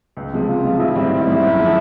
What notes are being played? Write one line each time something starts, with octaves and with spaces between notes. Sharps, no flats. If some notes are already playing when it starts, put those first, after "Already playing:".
C#2
C3 F3 G#3
C#2 F4
C3 F3 G#3
A1 E4
G#2 D#3 G3 C4
A1 E4
G#2 D#3 G3 C4
F#2
D3 F3 G#3